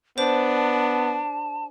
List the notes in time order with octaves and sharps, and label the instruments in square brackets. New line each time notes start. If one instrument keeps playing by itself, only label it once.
[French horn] B3 [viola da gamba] D4 [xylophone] C5 [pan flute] A5